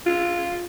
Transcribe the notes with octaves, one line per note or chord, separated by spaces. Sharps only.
F4